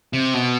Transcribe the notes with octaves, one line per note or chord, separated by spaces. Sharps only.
C3
B2